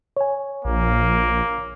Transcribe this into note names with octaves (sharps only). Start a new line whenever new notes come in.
C#5 G#5
A#1 A#3